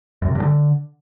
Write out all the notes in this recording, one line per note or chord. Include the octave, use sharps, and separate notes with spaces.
F#2
C3
G2
D3